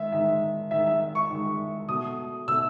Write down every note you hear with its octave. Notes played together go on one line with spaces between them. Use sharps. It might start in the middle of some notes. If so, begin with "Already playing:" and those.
Already playing: D#3 G#3 E5
D#3 G#3 E5
D#3 G#3 E5
E5
E5
C#6
D#3 G#3
B2 A3 D#6
B2 A3 E6